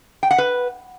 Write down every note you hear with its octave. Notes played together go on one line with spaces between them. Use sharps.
G5
F#5
B4